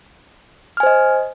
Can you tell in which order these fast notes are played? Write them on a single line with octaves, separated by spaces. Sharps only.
F6 G#5 C5 D#5